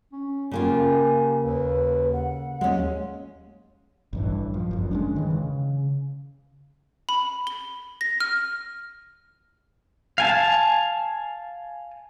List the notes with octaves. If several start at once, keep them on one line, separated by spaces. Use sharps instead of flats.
C#4
C#3 A#3 F4 G4 G#5
D#2 B4
F#5
D#2 G#3 C#4
A1 G2 E3
F3
G1 F#2
G#3 C#4 D4
D#3 E3
C#3
B5
G7
A#6
F6
F5 G#5 A5